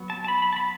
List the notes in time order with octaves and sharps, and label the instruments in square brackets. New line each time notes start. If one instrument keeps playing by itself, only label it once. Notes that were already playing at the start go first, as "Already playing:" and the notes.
Already playing: [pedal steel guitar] F#3 B3
A5
A5
B5
B5
A5
B5